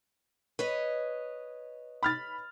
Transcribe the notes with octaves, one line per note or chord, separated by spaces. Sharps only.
B4 C#5 D#5
B5 F6 A6